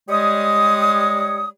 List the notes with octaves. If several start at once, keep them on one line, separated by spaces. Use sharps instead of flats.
G3 G#3 C#5 D#6